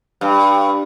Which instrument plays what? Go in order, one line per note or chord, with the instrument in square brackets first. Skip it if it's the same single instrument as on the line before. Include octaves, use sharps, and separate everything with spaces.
[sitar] G2